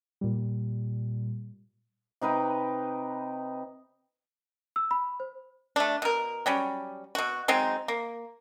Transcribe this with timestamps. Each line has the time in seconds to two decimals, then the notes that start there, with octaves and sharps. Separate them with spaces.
0.21 A#2 G3
2.21 C3 D#4 B4 G5
4.76 E6
4.91 B5
5.20 C5
5.76 A3 D4
6.02 B2 A#4
6.46 F#3 G3 C#4
7.15 B2 F#4
7.48 F#3 G#3 C4 D#4
7.88 A#3